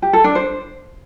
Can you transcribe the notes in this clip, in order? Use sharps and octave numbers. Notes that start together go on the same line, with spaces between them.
G4
A4
D4
C5